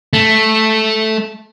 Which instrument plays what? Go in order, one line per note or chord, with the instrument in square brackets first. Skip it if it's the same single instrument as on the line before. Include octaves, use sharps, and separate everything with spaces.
[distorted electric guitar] A3